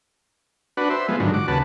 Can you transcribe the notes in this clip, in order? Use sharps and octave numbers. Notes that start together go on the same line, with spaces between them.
D4 F#4 B4
C5 E5
F3 G#3 B3
G#2 D3 D#3 F#3
F#4 D6
D#2 C#3 B4 F#5 A5